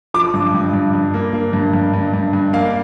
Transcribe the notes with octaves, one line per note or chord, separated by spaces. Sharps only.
F3 D6
G2
G2
G2
G2
A#3
A#3
G2
G2
G2
G2
G2
A#3 F5